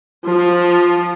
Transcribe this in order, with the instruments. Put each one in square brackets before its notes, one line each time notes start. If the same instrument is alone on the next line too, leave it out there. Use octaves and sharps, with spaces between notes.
[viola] F3